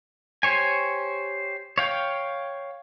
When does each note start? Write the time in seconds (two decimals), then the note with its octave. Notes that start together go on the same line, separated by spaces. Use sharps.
0.43 G4 C5 C#5 G#5
1.78 C#5 F5 G5